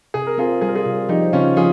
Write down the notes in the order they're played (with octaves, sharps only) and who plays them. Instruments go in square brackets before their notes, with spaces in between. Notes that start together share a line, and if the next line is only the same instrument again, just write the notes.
[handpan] C3 [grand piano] G#4
[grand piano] A#4
[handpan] C4 [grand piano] F4 G#4
[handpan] G3 [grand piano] G#4
[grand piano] A#4
F4 G#4
[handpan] C3
[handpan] F3 [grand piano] D#4 G4
[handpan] C#3 [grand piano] C#4 F4
[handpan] F3 [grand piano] F4 G#4